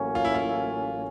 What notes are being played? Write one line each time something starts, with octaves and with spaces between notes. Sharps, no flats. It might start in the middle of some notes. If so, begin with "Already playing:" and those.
Already playing: A1 A2 F#3 A#3 C#4
F4
E4
F4